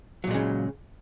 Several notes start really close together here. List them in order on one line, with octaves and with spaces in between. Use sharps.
F#3 A#2 G#3 C#3